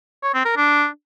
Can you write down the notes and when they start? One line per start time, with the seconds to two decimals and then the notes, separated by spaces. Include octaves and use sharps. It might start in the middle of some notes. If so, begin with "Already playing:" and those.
0.23 C#5
0.34 C4
0.45 A#4
0.56 D4